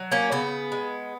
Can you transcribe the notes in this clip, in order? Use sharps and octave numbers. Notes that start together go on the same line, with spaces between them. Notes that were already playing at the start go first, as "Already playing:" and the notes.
Already playing: F#3
A#3 C#4
C#3 B3
G#3